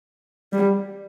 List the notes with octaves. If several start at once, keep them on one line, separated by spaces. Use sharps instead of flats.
G3